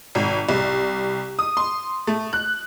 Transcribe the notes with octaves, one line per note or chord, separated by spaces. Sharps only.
G#1
C2
D#6
C6
A3
F#6